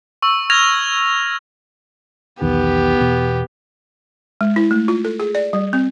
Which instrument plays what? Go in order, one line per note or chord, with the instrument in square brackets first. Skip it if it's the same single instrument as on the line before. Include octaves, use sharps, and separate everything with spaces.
[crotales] C#6 E6
F6 G#6 A#6 F7
[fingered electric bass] B1 E2 D#3 [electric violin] B3 G4
[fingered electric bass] E2 B2
[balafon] G#3
E4
A3
F4
A4
G#4
D5
G3
C4